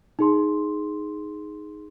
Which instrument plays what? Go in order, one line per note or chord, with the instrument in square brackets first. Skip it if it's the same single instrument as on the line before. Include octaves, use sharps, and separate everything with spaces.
[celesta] D#4 G#4 C6